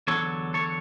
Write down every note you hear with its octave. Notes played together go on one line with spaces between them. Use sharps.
E2 D3 F#3 A4 C#5
A4 C#5